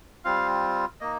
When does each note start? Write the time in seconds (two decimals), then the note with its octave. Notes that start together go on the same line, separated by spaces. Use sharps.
0.25 G3 C4 F4 F5
1.01 A#3 D#4 D#5